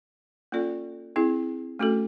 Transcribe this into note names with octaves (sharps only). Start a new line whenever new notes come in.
A#3 C#4 F4 A4 D5
C4 E4 G#4
A3 C#4 F#4 A4